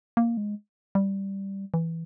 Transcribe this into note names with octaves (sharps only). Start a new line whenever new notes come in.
A#3
G#3
G3
E3